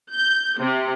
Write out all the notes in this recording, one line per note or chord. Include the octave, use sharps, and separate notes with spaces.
G6
C3